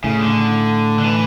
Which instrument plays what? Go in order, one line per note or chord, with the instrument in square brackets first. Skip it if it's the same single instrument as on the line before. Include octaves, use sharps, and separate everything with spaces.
[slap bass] A2 [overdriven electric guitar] C#3
[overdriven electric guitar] D3
D3
E3